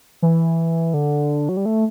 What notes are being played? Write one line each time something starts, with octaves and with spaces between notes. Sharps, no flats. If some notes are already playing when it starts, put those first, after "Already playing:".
E3
D3
F#3
G3
A3